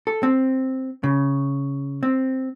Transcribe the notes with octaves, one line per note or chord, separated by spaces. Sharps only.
A4
C4
C#3
C4